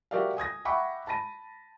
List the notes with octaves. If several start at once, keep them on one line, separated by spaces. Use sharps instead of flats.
F#4 G4 A#4 D5 E5 F5
G#5 D#6 G#6 A#6
E5 F#5 G5 B5 C#6 D6
A5 B5 A#6 D#7